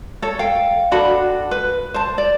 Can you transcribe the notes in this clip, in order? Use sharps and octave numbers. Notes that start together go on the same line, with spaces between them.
A4 C#5
F5 G5
D4 F#4 A4 B5
B4
C5 A5
D5